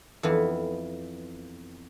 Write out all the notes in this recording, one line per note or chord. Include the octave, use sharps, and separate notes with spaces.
F2 E3 B3